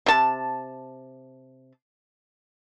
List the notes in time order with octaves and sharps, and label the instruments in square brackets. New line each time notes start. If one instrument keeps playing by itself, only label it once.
[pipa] C3 A5